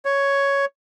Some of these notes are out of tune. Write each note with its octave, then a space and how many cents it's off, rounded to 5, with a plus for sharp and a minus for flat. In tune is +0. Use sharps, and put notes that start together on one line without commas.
C#5 +5